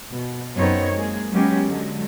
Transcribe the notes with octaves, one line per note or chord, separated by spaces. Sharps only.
B2
F#2 B3 C4 D#4 C#5
G#3 A#3 G#4
F#3 G#3 A#3 B3 C#4 G4
D3 F#3 G#3